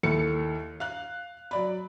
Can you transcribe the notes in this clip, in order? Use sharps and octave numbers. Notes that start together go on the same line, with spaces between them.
D#2 E4 A4 C#7
F5 F#6
F#3 D5 B5